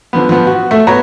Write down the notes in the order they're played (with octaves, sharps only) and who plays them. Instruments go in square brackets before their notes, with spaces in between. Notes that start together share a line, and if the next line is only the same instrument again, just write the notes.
[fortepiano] D3 F3 B3
F3 B3
F#4
A3
B3 F#4 C#5 A#5